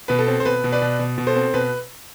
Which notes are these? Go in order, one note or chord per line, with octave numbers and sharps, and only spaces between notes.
B2 B4
A4
C4
C5
B2 B4
B2
B4 D5
B2
B2
B2
A4 C5
C4
B2 B4